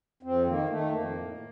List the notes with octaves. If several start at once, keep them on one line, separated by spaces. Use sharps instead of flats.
F2 C4
D#3 A#3
D#3 A3
F2 A#3
A2